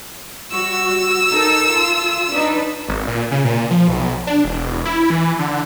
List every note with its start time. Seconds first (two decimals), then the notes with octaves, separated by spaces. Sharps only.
0.51 G3 F#4 E6
1.31 D#4 A4 A#4
1.71 F4
2.32 D4 D#4 B4
2.88 G#1
3.07 A#2
3.31 C#3
3.44 A#2
3.71 F3
3.88 B1
4.27 D4
4.44 E1
4.86 E4
5.10 E3
5.39 D3